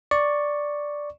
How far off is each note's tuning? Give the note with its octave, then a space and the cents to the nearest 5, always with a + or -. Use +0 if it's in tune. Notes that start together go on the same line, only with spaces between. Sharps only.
D5 +0 C#6 +0